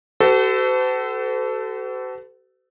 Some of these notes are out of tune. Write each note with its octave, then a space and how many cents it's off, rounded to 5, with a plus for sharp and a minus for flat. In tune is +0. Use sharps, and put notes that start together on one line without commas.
F#4 +40 A4 +0 C5 -45